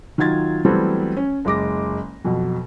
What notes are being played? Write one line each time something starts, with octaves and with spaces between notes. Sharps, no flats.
D#3 F#3 F4 G#6 A6
E3 F#3 G3 A3 B3 C4
C#4
F#1 G#3 D6 A#6
F2 B2 F#3